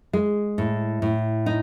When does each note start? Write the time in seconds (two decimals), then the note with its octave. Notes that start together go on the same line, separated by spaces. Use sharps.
0.13 G#3
0.58 A2
1.02 A2
1.46 D#4